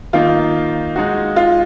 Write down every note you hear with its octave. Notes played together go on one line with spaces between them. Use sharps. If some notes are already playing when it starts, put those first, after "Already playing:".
D#3 A#3 D#4 F4
G#3 D#4 F#4
F4